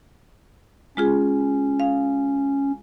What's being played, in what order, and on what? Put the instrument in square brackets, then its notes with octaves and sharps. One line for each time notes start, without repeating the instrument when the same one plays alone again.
[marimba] G#3 F4 G#4 [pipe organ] C#4
[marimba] F5